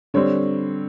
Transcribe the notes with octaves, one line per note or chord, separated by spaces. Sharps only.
D3 G3 C4 C#5